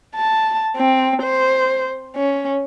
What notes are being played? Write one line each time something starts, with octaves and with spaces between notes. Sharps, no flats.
A5
C4
C5
C#4